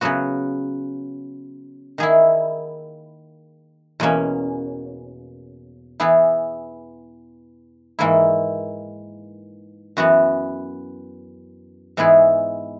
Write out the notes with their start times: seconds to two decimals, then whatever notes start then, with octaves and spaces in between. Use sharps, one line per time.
0.01 C#3 F#3 B3 F#4
1.98 D#3 A#3 E4 G#4
4.00 E2 B2 A#3 C#4
6.00 E3 B3 E4 G#4
7.99 G#2 E3 A#3 E4
9.97 F#2 E3 B3 F#4
11.97 G#2 E3 B3 E4 G#4